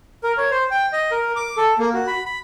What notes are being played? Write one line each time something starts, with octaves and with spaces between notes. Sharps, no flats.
A#4
C#5
C5
G5
D#5
A#4
D6
A4
A#3
F#4
B5
B5